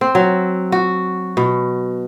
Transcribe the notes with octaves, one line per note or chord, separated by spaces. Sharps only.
C4
F#3
F#4
B2